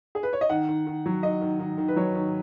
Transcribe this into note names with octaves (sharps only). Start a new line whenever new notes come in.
G#4
B4
C#5
D#5
D#3 F#5
D#3
D#3
F#3
D#3 D#5
D#3
D#3
D#3
B4
F#3 C#5
D#3